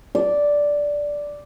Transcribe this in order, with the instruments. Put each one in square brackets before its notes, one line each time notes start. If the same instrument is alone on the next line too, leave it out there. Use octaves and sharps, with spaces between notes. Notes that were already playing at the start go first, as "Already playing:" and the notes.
[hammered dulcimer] D5